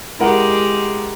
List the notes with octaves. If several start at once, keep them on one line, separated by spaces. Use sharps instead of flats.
G#3 E4 G4 A#4 F#5